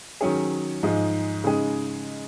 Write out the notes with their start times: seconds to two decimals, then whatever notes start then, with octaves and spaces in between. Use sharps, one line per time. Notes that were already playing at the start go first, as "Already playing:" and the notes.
0.21 D#3 F#3 C#4 G#4
0.83 G#2 F3 G#3 D#4
1.44 C#3 G#3 D#4 G#4